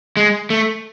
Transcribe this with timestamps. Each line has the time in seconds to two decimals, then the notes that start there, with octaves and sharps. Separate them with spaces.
0.17 G#3
0.50 A3